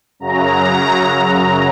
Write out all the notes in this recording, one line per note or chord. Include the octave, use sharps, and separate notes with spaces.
F#2 C#3 F#3 A#5